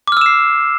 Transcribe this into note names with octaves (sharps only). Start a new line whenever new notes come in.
D6 E6 F6 C7 E7